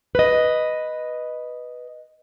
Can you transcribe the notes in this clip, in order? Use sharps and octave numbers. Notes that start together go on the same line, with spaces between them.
B4 D#5